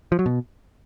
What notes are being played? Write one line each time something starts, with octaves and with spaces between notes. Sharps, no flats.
F3
F#3
B2